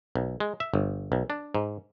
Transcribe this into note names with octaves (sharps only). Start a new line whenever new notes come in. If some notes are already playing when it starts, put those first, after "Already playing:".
B1
G#3
E5
G1
B1
D4
G#2